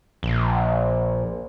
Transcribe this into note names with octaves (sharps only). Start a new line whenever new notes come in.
A#1